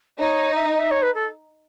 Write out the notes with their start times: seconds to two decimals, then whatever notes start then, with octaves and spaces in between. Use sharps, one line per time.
0.19 D#4 C#5
0.55 E5
0.74 D#5
0.78 E5
0.90 C#5
1.02 B4
1.14 A4